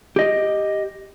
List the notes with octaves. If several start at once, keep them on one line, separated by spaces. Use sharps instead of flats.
G4 D#5